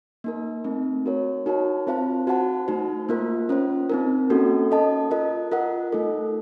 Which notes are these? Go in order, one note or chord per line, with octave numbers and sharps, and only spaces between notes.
A#3 D#4 A#4
A3 C4 D#4
F#4 A#4 C#5
D#4 F#4 A#4 C#5 A5
C4 F4 C5 F5 A5
F#4 C5 F#5 A5
A3 D#4 F#4 C5
A#3 F4 A#4
C#4 F4 C5
C4 D#4 A#4
A#3 C#4 F#4 A4
C#4 A4 D#5 A5
F4 A#4 D#5
F4 A#4 D#5 F#5
A3 D#4 A4